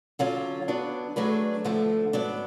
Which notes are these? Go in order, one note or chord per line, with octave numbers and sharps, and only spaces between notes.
D3 F#3 C#4 F4
F#3 B3 D4
F#3 A3 D4 G#4 B4
D2 D3 F3 A3
G#2 F#3 B3 D4